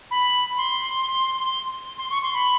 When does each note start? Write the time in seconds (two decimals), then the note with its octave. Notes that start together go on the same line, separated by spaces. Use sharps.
0.11 B5
0.57 C6
1.98 C6
2.10 C#6
2.22 C6
2.34 B5